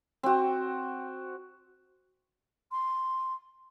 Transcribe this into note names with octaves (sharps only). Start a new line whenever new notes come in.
C4 F#4
C6